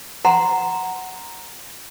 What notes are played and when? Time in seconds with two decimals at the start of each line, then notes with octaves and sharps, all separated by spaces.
0.25 F#5 A#5 C6